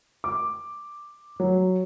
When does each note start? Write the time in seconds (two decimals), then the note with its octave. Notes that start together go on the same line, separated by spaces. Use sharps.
0.24 D6
1.40 F#3